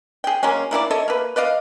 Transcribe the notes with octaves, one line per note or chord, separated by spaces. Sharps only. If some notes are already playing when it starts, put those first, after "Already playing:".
G#4 G5
F#3 G#3 A#3 C#4
A#3 E4 G#4 D5
A4 C#5 D#5 E5
A#3 B4
B4 D5 D#5 F5